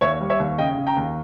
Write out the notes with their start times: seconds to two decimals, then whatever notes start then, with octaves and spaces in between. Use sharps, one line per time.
0.01 D#2 C#5 E5
0.21 G3
0.30 C#5 E5
0.39 D#2
0.58 C#3 D#5 G5
0.77 C#3
0.87 G5 A#5
0.97 D#2